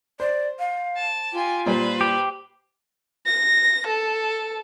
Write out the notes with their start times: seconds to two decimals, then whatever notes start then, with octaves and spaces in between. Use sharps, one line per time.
0.20 C5 D5
0.59 F5
0.96 A5
1.33 F4 G4 G#5
1.66 A#2 G3 B4 C5
2.01 G4
3.26 A#6
3.87 A4